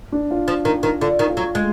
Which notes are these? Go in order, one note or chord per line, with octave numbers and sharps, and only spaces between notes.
D4
F4
F3
D#3
D#3
D3 F4
D#3
F4
F#3
G#3